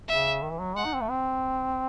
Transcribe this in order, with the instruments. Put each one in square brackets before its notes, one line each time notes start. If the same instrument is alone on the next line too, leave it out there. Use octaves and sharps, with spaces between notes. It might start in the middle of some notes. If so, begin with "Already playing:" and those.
[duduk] C#3 [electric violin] E5
[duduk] D#3
E3
F#3
[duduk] G#3 [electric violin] F#5
[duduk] D#4
C4
A3
C4